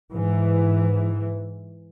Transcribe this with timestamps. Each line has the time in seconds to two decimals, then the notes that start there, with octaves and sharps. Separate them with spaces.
0.13 G#2 E3